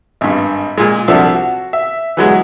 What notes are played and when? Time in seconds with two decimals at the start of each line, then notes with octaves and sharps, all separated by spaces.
0.21 G#1 G2
0.78 A#2 G#3
1.08 C2 F3 D4 F#4 A4 E5
1.35 F#4
1.73 E5
2.17 E3 F#3 G#3 B3